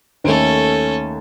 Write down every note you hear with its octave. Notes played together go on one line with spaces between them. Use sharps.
D#2 A3 C#4 A4